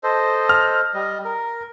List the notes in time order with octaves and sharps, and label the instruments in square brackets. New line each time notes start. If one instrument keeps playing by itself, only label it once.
[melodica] A4 C5 D#5
[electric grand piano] F6
[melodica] G3 D#5
A#4